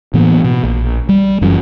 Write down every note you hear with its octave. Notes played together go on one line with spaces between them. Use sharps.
A2 E3 A#3 B3
B2
A#1
G3
F#1 F#2 E3 C#4